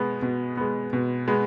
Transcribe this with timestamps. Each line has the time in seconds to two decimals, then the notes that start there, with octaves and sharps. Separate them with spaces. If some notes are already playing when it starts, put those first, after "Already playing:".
Already playing: B2 G#3 B3
0.22 B2
0.57 G#3 B3
0.93 B2
1.28 G#3 B3